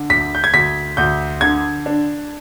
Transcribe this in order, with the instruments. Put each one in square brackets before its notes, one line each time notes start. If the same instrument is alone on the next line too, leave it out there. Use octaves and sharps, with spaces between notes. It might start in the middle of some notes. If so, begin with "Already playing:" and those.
Already playing: [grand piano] D3
D2 B6
G6
G#6
D2 B6
D2 G6
D3 G#6
D4